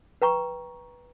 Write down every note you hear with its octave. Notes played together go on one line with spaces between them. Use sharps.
B4 G5 A#5 C#6